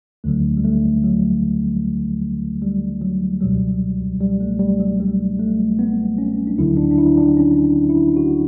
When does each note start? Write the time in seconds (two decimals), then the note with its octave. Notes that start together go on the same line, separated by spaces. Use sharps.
0.24 D2 D3 F#3 A3
0.57 G3
0.64 A3
1.04 F#3
2.62 G3
3.01 F#3
3.41 C#2 B2 F#3 G3
4.21 G3
4.40 A3
4.59 G3
4.80 F#3
5.00 G3
5.40 A3
5.79 B3
6.18 C#4
6.47 D4
6.58 D2 D3 F#3 E4
6.77 D4
6.91 D4
6.98 E4
7.18 D4
7.37 C#4
7.89 E4
8.16 F#4